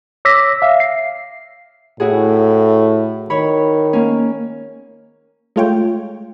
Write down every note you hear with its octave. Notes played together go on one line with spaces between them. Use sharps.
C#5 D6 E6 A#6 B6
E5 F5
C7
A2 E4 F#4 G#4
D#3 C#5 B5
A#3 C#4
G#3 A3 F4 C#5 G5